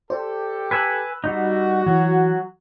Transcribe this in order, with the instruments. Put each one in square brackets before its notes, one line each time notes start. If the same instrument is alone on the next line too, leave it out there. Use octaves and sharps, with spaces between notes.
[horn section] G4 A4 [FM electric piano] C5 D5
[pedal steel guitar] B4 G#5 [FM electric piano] B5 E6 F#6
[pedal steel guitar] G3 D#4 [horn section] F#4
[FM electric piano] E3 [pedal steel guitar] F#3